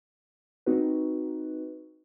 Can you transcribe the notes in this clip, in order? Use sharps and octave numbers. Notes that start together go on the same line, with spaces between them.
C4 D#4 F#4 B4